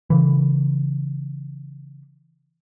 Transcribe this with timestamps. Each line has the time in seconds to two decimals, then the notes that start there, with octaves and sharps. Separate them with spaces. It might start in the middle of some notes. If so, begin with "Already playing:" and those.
0.10 C#3 E3